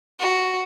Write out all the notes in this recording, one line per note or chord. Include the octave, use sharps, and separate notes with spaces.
F#4